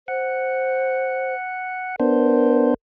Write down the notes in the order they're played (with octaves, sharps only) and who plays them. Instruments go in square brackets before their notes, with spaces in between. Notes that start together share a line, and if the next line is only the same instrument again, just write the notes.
[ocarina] C5 [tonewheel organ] F#5
[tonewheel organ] B3 D4 C5 [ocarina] A#4